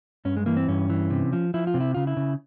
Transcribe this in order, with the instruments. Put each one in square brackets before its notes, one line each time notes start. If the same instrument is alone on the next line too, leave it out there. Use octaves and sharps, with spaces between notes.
[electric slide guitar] G2 C#4
G#3
E3 A#3
C4
G2 C#4
E3
C3
F3
F3 E4
F4
C3
E4
C#3 F4
E4
C#3